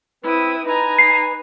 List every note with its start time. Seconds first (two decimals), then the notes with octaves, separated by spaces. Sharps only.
0.24 C4 E4 B4 D#6
0.66 D#4 B4 G#5 A#5
0.98 C7